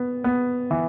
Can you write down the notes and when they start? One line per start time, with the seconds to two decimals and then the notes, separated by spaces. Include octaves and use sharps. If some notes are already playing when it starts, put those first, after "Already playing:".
Already playing: B3
0.24 B3
0.71 E3